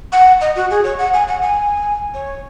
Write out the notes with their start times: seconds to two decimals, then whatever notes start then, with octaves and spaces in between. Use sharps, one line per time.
0.12 F#5
0.41 D#5
0.56 F#4
0.70 G#4
0.84 C#5
0.99 F#5
1.14 G#5
1.28 F#5
1.42 G#5
2.14 C#5